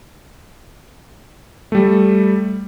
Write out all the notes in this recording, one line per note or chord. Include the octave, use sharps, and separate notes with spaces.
G3 A3